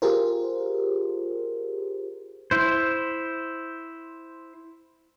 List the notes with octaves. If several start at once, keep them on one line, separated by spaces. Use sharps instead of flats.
F4 G4 G#4 A#4 C5
E4 C5